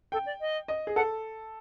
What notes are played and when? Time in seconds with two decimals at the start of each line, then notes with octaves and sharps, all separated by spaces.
0.12 A4 G5
0.26 D5
0.41 D#5
0.68 D#5
0.87 G#4
0.96 A4 F#5